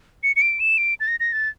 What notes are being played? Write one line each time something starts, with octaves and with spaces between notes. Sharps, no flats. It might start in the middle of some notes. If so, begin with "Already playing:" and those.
C#7
C#7
D7
E7
D7
A6
A#6
A#6
A6